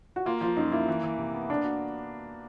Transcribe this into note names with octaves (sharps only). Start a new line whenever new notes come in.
F#4
A#3 F4
F3 F4
F#2 D#4
A#3 E4
E3
E3
C3
B3
A#3 D4
F#4